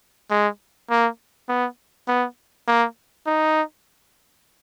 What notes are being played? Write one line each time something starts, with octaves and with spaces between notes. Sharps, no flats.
G#3
A#3
B3
B3
A#3
D#4